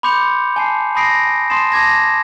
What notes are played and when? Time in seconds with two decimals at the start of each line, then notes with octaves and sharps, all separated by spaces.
0.03 B5 C6 D6 G6 C#7 F7
0.56 G#5 A5 C7
0.95 A5 B5 D#6 A#6 C7 D7
1.27 G#5
1.50 A5 C6 D#6 A6 C7 E7
1.72 A5 D6 G#6 A#6